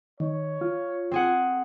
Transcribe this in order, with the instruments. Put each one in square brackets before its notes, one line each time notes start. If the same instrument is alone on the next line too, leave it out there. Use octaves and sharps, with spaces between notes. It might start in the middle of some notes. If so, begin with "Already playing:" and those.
[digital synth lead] D#3 [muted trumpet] C#5
[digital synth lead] F4
[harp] C4 G#4 F#5